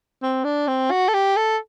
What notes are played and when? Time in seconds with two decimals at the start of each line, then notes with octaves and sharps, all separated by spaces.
0.22 C4
0.44 D4
0.68 C4
0.91 F#4
1.08 A4
1.14 G4
1.37 A4